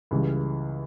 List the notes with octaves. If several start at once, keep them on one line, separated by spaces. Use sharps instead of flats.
C#2 C#3 E3 G3